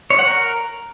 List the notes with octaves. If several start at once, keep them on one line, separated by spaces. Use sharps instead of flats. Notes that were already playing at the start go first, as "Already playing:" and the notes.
C#5
F#5
A#4